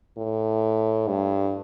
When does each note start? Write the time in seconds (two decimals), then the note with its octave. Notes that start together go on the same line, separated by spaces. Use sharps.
0.17 A2
1.08 G2